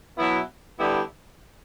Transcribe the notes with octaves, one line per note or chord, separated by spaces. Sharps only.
B2 F#3 B3 E4
D3 G3 B3 E4 G4